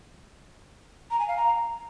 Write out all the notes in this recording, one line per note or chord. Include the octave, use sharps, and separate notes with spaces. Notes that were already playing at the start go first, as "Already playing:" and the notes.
A#5
G#5
F5
A#5